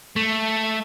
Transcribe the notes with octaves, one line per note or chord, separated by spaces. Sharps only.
A3